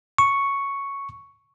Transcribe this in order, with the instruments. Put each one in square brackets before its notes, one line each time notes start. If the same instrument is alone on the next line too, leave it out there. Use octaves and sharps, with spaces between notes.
[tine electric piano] C#6